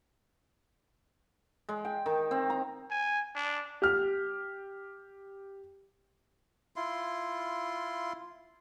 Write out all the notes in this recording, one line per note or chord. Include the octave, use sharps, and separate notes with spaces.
G#3
G5
D#3
C4
A#5
G#5
D4
G4 F6
E4 F4 C6